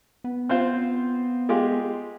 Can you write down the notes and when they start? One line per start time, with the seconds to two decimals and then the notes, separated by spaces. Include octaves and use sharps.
0.24 B3
0.49 C4 F4 C5
1.49 G#3 F4 G4